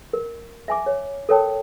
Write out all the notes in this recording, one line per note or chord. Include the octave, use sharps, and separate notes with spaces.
A#4
E5 G#5 D6
C#5
A4 A#4 C#5 G5 A5